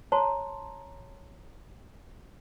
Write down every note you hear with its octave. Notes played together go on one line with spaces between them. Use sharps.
C5 C#5 A5 A#5 C6